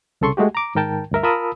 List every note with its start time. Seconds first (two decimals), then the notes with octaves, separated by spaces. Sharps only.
0.21 C2 C#3 A4 C6 C#6
0.37 G#3 A3 F#4 G4
0.55 A#5 D6
0.75 G#2 D#3 A#4 G5 A5
1.11 D2 G2 A#4 E5
1.23 F4 A#4 A5 B5 D#6 E6